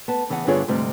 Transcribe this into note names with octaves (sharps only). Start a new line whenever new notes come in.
B3 A5
C#3 E3 B3 G#4 F#5
G2 D3 B3 F4 G#4 C#5
D2 G#2 C3 G3 C4